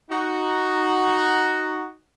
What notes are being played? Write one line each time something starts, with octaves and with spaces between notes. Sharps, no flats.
D#4 F#4